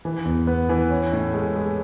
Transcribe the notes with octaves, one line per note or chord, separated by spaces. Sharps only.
E3
E2
B3
E3
C#4
A2
G#3
G#3